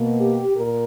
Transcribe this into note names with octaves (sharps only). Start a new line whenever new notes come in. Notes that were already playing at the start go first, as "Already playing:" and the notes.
Already playing: B2 A#3
G4
A#2 A#4